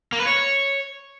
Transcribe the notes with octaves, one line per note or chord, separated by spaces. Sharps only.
A#3
B4
C#5